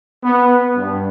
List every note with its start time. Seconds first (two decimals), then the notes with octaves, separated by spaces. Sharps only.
0.23 B3
0.76 G2